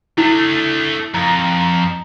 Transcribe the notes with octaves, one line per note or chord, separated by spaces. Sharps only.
A3 D4 E4
F2 A#5